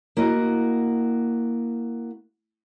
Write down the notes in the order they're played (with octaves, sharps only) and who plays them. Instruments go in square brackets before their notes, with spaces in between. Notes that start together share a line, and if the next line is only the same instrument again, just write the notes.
[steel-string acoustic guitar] A#3 E4 F#4 D#5